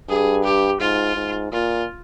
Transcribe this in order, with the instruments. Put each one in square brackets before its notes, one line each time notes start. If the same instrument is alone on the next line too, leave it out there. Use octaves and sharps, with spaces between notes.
[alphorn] G2 [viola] G#4
[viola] G4
[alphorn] G#2 [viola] F4
[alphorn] G#2
[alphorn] A#2 [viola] F4